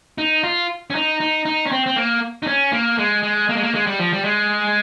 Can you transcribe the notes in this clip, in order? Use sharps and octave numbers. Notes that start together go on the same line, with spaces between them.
D#4
F4
C#4
D#4
D#4
D#4
C#4
C4
C4
A#3
D#4
C#4
A#3
G#3
G#3
A#3
G#3
A#3
G#3
G3
F3
G3
G#3